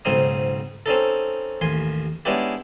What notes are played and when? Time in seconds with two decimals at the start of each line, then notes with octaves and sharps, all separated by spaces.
0.05 B1 G#2 C#3 C4 D#4 D#6
0.86 C4 C#4 D#4 A4
1.61 A1 D#2 G#5 C6
2.25 G#3 B3 C#4 D4 E4 G4